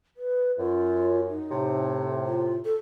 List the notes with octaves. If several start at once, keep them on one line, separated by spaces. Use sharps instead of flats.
B4
F#2 F4
D#4
A2 C3
F4
A4